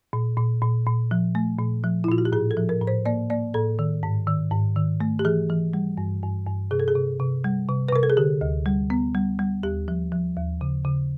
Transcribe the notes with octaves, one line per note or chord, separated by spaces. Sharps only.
A#2
A#2
A#2
A#2
F3
A3
A#2
F3
E4
A#2 F4
F#4
G4
A2 G#4
A4
F3
A#4
A2
C5
A#3 D5
A#3 D5
A2 A4
D#3
G#2
D#3
G#2
D#3
A3
G4
E3 G#4
E3
G3
G2
G2
G2
C3 G#4
A4
G#4
C3
C3
G3
C3
B4
C3 A#4
A4
G#4
D3 G4
D2
G3
B3
G3
G3
D#2 G4
F3
F3
D#2
C#3
C#3